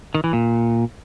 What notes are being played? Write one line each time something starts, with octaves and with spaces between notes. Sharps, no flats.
D#3
E3
A#2